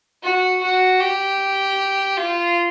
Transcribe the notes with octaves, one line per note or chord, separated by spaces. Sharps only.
F#4
F#4
G4
F4